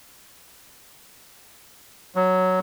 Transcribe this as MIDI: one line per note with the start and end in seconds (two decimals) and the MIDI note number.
2.16 2.60 54